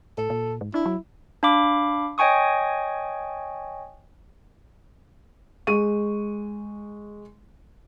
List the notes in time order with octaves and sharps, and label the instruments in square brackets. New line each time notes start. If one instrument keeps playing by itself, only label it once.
[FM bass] A2 [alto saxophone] A4
[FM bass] A#2
G#2
[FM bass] D4 [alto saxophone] E4
[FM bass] F#3
[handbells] D4 F5 B5 D6
C#5 D#5 G5 G#5 C#6 D#6
[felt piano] G#3 C#6 D#7